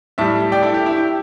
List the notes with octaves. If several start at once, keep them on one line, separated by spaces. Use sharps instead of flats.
A2 G3 E5 A5
D5 G5
E4 A4
G4
E4
G4